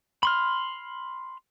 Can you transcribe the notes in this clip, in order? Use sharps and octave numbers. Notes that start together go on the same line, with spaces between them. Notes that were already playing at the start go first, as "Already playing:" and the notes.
B5 C6 F6